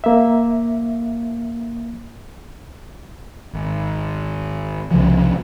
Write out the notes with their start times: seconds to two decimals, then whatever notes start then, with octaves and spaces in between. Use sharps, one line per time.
0.04 A#3 E5
3.53 G#1
4.91 C2 C#3 F3